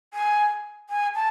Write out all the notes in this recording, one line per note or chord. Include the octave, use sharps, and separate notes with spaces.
G#5
G#5
A5